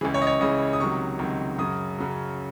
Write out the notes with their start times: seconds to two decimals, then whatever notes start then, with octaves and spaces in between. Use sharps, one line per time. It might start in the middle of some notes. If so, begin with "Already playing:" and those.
0.01 C#2 C#3 E3 G#4
0.14 C#5
0.22 D#5
0.27 C#5
0.40 C#2 C#3 E3 D#5
0.73 D#6
0.80 C#2 C3 D#3 F#3 C#6
1.19 C#2 C3 D#3 F#3
1.58 F#2 C#3 F#3 D#6
1.98 F#2 C#3 F#3